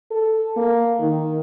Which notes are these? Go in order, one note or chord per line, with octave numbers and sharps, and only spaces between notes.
A4
A#3
D#3